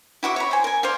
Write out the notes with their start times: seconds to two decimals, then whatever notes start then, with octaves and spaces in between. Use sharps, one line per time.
0.23 E4 F#4 E5 D6
0.36 C#5 A#5 B5
0.51 C5 G#5
0.64 A#4 G#5
0.83 C5 D5 F5